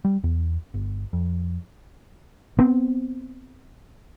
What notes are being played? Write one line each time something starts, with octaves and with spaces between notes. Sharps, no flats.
G3
E2
G1
F2
B3 C4